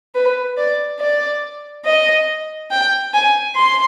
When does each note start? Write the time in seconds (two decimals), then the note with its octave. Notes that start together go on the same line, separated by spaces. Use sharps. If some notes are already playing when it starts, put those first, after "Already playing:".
0.15 B4
0.57 D5
1.00 D5
1.85 D#5
2.71 G5
3.14 G#5
3.56 C6